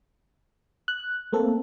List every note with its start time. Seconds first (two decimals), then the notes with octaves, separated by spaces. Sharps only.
0.88 F#6
1.33 A3 A#3 C4 A4